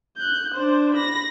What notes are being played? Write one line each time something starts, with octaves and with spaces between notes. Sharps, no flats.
F#6 G6
D4 C5
B5 A#6